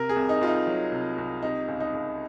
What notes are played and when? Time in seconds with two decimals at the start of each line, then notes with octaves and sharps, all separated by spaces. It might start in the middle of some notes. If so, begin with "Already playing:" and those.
Already playing: C3 A#4
0.09 G#4
0.16 C2
0.29 D#4
0.41 C2 F4
0.47 D#4
0.67 F#3
0.92 C3
1.18 C2
1.42 C3 D#4
1.68 C#2
1.80 D#4
1.93 C#2